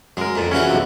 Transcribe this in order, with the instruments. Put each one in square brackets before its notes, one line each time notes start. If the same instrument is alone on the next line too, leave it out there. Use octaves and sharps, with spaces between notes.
[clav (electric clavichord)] F#2 A#4 [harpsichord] G#3
[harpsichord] F2 A#2
[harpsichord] C#3 E3 F#4 [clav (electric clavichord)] C#4
[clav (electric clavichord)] B1 C3